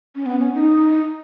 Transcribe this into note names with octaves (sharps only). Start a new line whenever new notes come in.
C#4
B3
C#4
D#4